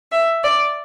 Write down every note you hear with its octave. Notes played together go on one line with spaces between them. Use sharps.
E5
D5